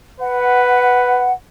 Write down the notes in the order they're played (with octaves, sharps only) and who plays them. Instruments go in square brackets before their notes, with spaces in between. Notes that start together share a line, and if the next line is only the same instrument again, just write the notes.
[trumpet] B4 [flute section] F#5